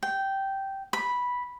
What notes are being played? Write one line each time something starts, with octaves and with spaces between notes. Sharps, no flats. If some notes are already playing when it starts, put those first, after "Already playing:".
G5
B5